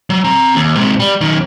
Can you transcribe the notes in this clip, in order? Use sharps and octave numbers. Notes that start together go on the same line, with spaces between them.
F#3
C4 A#5
D#2
G#2 C3
G3
F#2 D#3